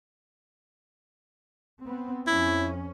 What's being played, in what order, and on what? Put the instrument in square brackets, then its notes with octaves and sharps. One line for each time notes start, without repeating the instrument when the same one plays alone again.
[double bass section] B3 C4
[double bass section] F2 C#4 [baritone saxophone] E4